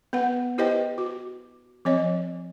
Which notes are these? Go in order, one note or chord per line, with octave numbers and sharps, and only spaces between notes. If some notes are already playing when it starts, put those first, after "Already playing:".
B3 B4 F#5
E4 G4 B4 C5 D#5 G5
F#4
F3 C4 C#5 D#5